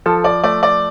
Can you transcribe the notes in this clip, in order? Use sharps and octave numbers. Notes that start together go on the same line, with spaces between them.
F3 A4
D5
A3 D5
D5